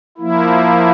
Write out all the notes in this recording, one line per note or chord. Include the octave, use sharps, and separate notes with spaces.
F3 A#3 E4